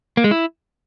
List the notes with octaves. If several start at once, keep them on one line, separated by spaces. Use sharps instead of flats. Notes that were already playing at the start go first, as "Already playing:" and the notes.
A#3
G#3
E4